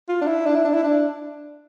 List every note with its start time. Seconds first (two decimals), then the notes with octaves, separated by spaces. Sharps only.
0.08 F4
0.21 D4
0.27 E4
0.46 D4
0.56 E4
0.65 D4
0.73 E4
0.83 D4